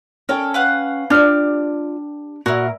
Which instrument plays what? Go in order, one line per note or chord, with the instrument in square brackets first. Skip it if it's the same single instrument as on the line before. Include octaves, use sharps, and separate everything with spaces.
[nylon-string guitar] C#4 C#5 G5 [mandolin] A4 A#4
[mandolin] B4 F5 F#5
[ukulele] D4 [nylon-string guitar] F4 D5 [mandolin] G4 F6
[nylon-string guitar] A#2 [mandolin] E4 A#4 [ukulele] F#4